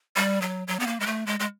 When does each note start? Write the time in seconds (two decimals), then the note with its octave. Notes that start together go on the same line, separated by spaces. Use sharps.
0.16 G3
0.42 F#3
0.67 F#3
0.80 B3
0.87 A#3
1.00 G#3
1.06 A3
1.26 G#3
1.40 G#3